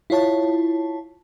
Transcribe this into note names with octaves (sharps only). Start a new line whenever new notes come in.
E4 F4 C#5 A5